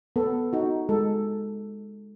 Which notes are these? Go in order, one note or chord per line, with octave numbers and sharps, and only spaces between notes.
B3 A4
D#4 F#4
G#3 A4